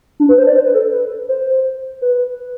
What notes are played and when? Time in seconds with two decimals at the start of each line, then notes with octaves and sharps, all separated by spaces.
0.20 D4
0.29 B4
0.38 C5
0.47 D5
0.56 C5
0.65 B4
0.74 A4
0.92 B4
1.29 C5
2.02 B4